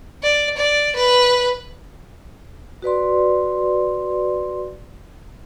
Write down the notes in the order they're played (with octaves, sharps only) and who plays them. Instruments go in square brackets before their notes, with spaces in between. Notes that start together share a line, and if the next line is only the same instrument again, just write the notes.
[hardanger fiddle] D5
D5
B4
[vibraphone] F#4 B4 D5 C6